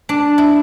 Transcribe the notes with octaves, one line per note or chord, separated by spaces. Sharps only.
D4
E4